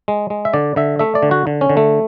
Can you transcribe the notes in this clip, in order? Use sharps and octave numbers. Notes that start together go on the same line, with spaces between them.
G#3
G#3
E5
D3 D5
D3 E5
A3 E5
D5
D3
F#4
D3
C#4
D3
A3